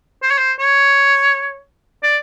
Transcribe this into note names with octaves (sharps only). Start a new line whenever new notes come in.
C5
C#5
C5
C#5
D5